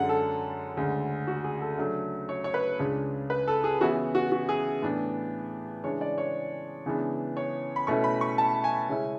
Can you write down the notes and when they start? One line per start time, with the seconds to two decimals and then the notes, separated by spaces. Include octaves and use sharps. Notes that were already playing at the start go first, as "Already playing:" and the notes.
Already playing: F#2 D3 G#3 F#5
0.09 A4
0.77 D2 C#3 G#3 C#4
1.27 F#4
1.44 G#4
1.61 A4
1.78 C#3 F#3 A3 D4
2.29 C#5
2.44 C#5
2.54 B4
2.79 C#2 C#3 G#3 D4
3.30 B4
3.48 A4
3.64 G#4
3.81 C#3 E3 B3 E4 F#4
4.15 F#4
4.32 F#4
4.49 G#4
4.82 A2 E3 B3 D4
5.84 C#3 E3 G#3 D4 C#5
6.01 D5
6.18 C#5
6.86 C#3 E3 G#3 B3 D4
7.37 C#5
7.76 B5
7.87 B2 A3 C#4 E4 C#6
8.04 B5
8.21 C#6
8.38 A5
8.64 G#5
8.89 C#3 G#3 C#4 E4